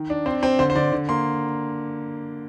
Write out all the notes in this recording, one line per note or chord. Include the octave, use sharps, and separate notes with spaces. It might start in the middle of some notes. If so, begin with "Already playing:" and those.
Already playing: D#3
D4
C4 C5
C4 C5
D3 C5
C5
D3 D5
D3
A#3 C6